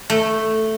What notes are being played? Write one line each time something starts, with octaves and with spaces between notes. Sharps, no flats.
A3